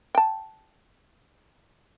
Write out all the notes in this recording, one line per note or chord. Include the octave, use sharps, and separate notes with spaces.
G5 A5